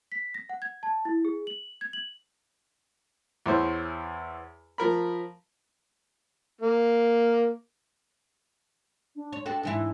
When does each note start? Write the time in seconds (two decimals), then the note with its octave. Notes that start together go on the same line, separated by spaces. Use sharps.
0.12 B6
0.34 A#6
0.49 F#5
0.62 G#6
0.83 A5
1.05 E4
1.25 G#4
1.47 F#7
1.81 G#6
1.93 F#7
3.46 E2 E3 C5 C#5
4.78 F3 A#4 B5
6.61 A#3
9.16 D4
9.33 C#5
9.46 D4 F#4 A4 G5
9.63 G#2 E3 D4 E4